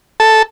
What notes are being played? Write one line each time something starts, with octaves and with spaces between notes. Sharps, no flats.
A4